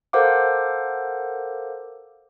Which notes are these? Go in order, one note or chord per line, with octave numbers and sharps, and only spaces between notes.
A4 A#4 C5 F5 F#5 D6